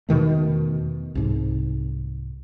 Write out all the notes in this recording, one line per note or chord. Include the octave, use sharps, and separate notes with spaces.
E2 B2 D#3 A3
C2 G#2